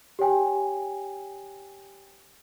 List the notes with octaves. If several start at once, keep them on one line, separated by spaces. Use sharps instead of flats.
G4 C#5 G5 G#5